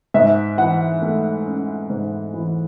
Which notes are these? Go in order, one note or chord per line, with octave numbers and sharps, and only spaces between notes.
G#2 E5
E3 F#5
A3
C#4
G#2
E3